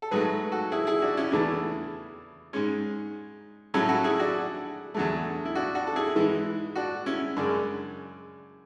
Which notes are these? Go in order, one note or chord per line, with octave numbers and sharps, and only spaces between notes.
A4
G#2 F#3 A3 G#4 B4
F#4 A4
E4 G#4
E4 G#4
D4 F#4
C#4 E4
E2 C#3 E3 A3 D4
G#2 G#3 C#4
A2 F#3 A3 C#4 E4
F#4 A4
E4 G#4
D4 F#4
E2 D3 F#3 A3
E4
D4 F#4
D4 F#4
A4
E4 G#4
G#2 E3 G#3
D4 F#4
C#4 E4
F#2 C#3 G#3 D4